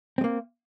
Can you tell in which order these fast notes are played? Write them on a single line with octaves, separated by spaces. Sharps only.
C4 G#3 A#3